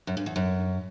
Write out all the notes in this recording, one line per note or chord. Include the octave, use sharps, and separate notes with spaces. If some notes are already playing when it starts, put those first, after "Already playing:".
F#2
G2
E2
F#2